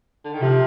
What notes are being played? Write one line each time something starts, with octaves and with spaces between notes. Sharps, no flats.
D3
D#3
C3 F3